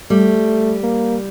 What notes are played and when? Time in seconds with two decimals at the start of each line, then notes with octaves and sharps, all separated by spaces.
0.10 G3 A3
0.83 A#3